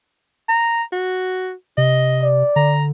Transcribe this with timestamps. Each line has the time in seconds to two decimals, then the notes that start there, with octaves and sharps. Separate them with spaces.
0.48 A#5
0.92 F#4
1.78 C3 D#5
2.22 D5
2.56 D3 A#5